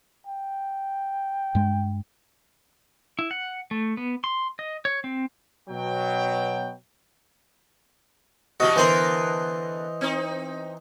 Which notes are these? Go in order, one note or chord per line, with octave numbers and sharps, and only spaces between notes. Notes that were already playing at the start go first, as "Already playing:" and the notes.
G5
G2 G#3
E4
F#5
A3
B3
C6
D#5
C#5
C4
B2 F#3 G5
B2 E3 G3 F#4 D#5
D3 E3 B3 A#4 C5 C6
C4 D#4